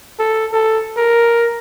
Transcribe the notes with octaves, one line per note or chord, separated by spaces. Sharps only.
A4
A4
A#4